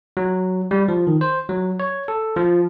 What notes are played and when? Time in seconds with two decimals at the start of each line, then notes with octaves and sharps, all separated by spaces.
0.17 F#3
0.71 G3
0.88 F3
1.07 D#3
1.21 C5
1.49 F#3
1.80 C#5
2.08 A4
2.36 F3